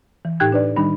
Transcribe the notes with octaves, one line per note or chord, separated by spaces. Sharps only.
E3
A2 D#4 G4 G5 F#6 G#6
D4 B4 D5
D#3 G3 D4 D#4 B5